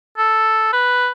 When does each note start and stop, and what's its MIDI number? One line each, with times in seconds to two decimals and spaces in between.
0.18 0.70 69
0.73 1.10 71